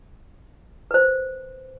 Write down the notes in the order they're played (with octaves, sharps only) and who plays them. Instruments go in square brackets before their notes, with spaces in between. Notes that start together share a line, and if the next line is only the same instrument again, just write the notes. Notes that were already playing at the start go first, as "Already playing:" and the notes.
[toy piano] B4 C5